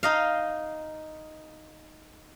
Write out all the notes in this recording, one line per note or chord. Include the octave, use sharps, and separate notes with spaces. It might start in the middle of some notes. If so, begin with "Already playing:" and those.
D#4 D#5 F5